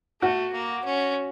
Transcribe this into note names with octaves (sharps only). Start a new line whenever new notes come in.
A3 F#4
A#3
C#4